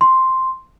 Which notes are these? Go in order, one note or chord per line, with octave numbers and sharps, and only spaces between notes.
C6